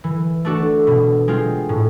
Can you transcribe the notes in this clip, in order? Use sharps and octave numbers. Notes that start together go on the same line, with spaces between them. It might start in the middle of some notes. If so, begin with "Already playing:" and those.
E3
A3 D4 F#4 A4
B2
G#3 C4 F4
A2